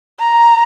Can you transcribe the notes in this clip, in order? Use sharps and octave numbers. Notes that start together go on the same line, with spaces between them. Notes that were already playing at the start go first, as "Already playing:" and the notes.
A#5